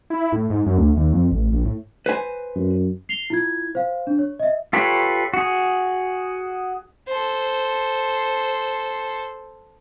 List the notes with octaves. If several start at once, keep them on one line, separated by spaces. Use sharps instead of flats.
E4
A2
G#2
F#2
D2
D#2
F2
A1
A#1
A2
B4 C5 G#5
F#2
C7 F7 G7
E4 F4 G#6
C5 F5
D4
C#5
D#5 E5
F4 G4 A4 B4 C#5
F#4 G#4
A4 C5